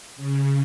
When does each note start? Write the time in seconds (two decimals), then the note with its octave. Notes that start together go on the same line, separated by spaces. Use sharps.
0.16 C#3